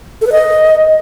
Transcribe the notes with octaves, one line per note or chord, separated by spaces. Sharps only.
A4
B4
D#5